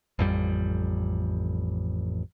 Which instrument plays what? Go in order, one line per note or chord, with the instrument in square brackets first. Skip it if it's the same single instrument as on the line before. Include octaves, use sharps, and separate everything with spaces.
[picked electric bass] A1 F2 G3